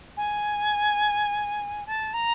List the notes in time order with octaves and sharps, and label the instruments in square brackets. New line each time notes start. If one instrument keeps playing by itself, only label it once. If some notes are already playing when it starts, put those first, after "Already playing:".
[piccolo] G#5
A5
A#5